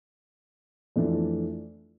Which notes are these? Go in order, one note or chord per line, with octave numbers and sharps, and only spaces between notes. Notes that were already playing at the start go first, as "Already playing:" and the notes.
F2 E3 A3 D4